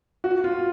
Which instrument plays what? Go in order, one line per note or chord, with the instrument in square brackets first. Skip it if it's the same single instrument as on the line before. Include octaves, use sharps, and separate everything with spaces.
[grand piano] F#4
F4